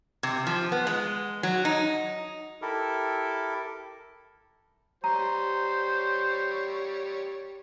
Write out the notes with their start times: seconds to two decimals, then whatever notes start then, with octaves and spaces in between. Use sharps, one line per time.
0.23 C3
0.47 F3
0.72 B3
0.87 G#3
1.43 F#3
1.65 D#4
2.62 E4 G4 A4 A#4
5.04 G3 C5 C#5 A#5